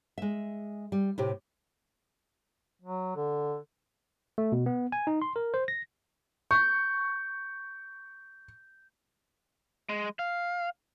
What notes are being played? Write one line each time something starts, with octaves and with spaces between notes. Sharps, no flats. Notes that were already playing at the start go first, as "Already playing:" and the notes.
G#3 E5
G3
A2 C3 G4
F#3
D3
A3
B2
B3
G#5
D#4
C6
A#4
C5
A#6
C#6 G6
G#3
F5